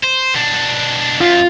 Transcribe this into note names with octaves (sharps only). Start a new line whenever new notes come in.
C5
B2 D4
F#2 F4